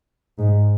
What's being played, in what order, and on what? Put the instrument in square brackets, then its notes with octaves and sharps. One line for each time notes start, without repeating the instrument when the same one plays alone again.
[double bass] G#2